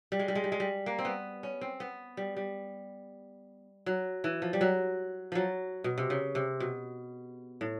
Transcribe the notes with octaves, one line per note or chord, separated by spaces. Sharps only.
G3
G#3
G3
G#3
G3
G#3
G3
A#3
C4
B3
C#4
C4
B3
G3
G3
F#3
E3
F3
G3
F#3
F3 F#3
B2
C3
C#3
C3
B2
A2